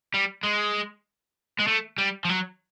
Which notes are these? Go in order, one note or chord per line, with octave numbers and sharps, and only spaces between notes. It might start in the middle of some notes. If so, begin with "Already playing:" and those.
G3
G#3
G#3
A3
G3
F3
F#3